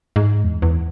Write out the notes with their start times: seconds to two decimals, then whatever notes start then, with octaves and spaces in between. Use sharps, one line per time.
0.16 G#2
0.44 E2
0.62 E2